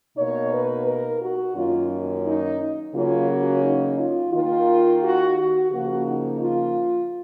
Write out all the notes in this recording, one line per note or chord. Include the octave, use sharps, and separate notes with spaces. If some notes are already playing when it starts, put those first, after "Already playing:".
B2 A#3 D#4 C#5
B4
A#4
F#4
F#2 D#3 A#3 C#4 F4
D#4
C#3 F#3 A#3 C#4 F4
F#4
D#4
F4
D#3 A#3 D#4 F4
F#4
F#4
C#3 F3 A#3 F#4
D#4
F4